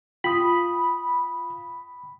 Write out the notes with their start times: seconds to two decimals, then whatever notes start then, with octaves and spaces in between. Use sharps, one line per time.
0.24 F4 G5 B5 D#6